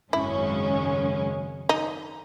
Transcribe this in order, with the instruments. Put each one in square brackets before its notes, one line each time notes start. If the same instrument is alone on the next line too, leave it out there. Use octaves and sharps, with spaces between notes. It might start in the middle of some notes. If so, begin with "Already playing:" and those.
[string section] G#1 F#2 C#3 G#3 C#4 [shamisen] E4
[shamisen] D#4